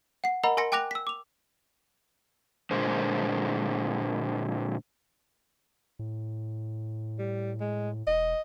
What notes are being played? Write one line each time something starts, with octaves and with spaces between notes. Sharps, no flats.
F#5 C7
A#4 D#5 F#5 A#5 B5
A#4 G#5 C6 A#6 C#7
G5 G#5 D6 F#6 A#6 F7
E6 B6
D6 F7
A#2 D3 G#3 C5
A2
G3
G#3
E1 D#5